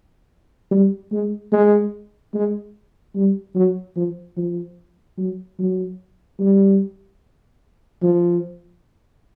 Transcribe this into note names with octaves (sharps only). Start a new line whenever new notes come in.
G3
G#3
G#3
G#3
G3
F#3
F3
F3
F#3
F#3
G3
F3